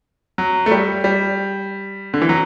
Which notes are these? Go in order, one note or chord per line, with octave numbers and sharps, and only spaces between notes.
F#3
A3
G3
G3
D3
E3
F#3